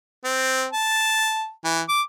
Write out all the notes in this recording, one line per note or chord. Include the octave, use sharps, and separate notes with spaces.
C4
A5
E3
D6